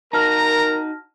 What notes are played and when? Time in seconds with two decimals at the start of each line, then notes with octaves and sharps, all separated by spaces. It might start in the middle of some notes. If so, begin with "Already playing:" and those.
0.13 D#4 F#4 A#4 A5 A#5 F6 A#6